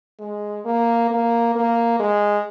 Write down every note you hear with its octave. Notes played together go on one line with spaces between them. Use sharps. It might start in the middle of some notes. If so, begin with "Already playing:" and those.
G#3
A#3
A#3
A#3
G#3